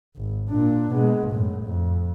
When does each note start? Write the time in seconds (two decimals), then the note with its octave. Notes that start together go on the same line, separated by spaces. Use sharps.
0.16 G#1
0.50 A#2 D4
0.93 B2 G#3
1.31 F#2 A2
1.64 F2